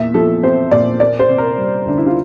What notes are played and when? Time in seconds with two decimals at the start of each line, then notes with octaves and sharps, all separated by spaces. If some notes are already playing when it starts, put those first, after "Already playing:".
Already playing: E2 A#2 E5
0.14 F3 A4
0.43 C4 C5
0.71 A#2 D5
1.00 A#3 D5
1.19 C5
1.29 C3
1.38 A#4
1.58 G3
1.85 D2 D4
1.97 E4
2.06 F4